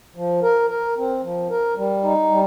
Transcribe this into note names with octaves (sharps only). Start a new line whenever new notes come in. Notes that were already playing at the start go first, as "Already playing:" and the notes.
F3
A#4
A#4
C4
F3
A#4
G3
D#4
G3